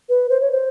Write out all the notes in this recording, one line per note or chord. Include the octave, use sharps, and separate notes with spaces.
B4
C5
C#5
C5